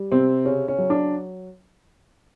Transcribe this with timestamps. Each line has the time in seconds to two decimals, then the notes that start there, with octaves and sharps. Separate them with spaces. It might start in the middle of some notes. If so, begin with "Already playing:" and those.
Already playing: G3
0.12 C3 C4
0.45 C#3 C#4
0.68 C#4
0.78 F#3
0.90 D4